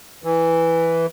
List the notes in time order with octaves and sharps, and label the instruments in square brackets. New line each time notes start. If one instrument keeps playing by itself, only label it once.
[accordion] E3